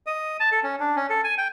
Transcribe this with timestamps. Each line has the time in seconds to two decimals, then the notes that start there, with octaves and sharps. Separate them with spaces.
0.07 D#5
0.40 A5
0.52 A4
0.63 C#4
0.80 D4
0.96 C#4
1.10 A4
1.24 G#5
1.38 G5